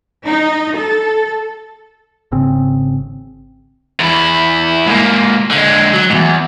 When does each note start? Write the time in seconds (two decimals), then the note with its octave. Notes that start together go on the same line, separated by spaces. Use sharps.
0.24 D#4
0.77 A4
2.32 G#1 C#3 C4
4.00 E2 E4
4.87 G#2 A#3
5.51 D3 G#3
5.94 F#3
6.10 E2 G#2